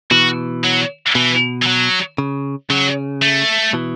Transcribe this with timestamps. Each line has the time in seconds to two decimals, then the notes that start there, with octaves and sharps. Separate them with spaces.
0.11 B2 E3 F#4
0.64 F#3
1.15 B2 E3
1.62 E3
1.66 F#3
2.18 C#3
2.70 C#3 F#3
3.22 A3
3.73 B2 E3